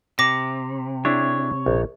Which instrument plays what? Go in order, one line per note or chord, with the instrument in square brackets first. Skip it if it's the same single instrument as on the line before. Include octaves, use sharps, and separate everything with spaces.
[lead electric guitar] C3 [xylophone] D6 A#6
[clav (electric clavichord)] D4 E4 G#4 [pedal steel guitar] C#5
[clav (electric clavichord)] A#1